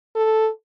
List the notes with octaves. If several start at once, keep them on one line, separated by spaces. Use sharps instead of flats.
A4